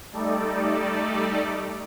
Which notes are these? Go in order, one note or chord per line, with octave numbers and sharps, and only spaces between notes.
G3 A3 D#4 A4 D5